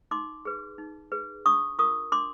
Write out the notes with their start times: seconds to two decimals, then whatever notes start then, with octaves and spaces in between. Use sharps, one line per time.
0.11 D#4 C6 D6
0.45 G#4 B4
0.78 D#4
1.12 G#4 B4
1.46 D4 C#6 D#6
1.79 F4 A#4 C#6 D#6
2.12 D4 C6 D6